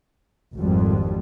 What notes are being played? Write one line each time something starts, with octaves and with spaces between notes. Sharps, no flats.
G#1 F2 G3